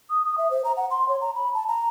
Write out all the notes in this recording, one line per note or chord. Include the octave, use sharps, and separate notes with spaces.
D#6
D#6
E5
C5
A#5
F#5
C6
C#5
A#5
B5
A5
A#5